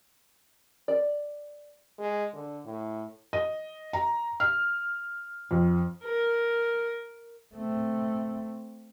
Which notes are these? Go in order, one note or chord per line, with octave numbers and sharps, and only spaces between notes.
D5
G#3
D3
A2
D#5
A#5
F6
F2
A#4
A3 C4